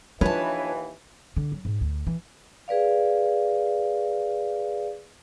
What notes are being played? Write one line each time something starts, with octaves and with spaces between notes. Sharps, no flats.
D#2 E3 F3 D4 B4 C#5 A5
D3
F#3
G#2
D2
E3
G#4 B4 D5 F5